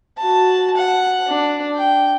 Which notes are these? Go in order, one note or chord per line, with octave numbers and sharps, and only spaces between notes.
F#4 A5
F#5
D4
G5